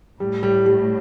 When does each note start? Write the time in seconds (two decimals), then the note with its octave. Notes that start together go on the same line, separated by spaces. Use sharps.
0.20 A2 G3
0.43 G3
0.66 G3